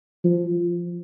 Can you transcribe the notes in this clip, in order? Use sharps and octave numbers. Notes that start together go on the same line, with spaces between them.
F3